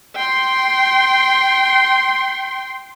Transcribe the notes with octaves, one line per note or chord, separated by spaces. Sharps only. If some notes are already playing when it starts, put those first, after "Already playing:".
G5 C6